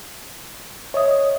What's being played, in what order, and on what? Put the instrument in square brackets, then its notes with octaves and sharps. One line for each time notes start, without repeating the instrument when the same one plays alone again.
[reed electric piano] C#5 [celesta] D#5 E5 D#6